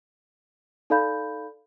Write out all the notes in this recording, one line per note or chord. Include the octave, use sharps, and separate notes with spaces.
D#4 A4 D5 F5 B5 G6